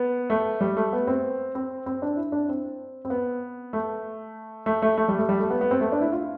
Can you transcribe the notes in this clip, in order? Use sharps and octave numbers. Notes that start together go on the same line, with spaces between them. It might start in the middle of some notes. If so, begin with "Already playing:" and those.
Already playing: B3
A3
G3
A3
B3
C4
C4
C4
D4
E4
D4
C4
C4
B3
A3
A3
A3
A3
G3
A3
G3
A3
B3
B3
C4
A3
D4
E4
F4